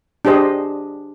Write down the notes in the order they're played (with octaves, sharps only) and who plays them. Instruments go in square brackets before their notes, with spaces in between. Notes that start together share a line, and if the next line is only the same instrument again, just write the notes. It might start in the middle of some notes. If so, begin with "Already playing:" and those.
[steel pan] D4 G4 G#4 C5 D#5